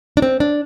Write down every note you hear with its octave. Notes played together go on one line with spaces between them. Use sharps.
D4
C4
D4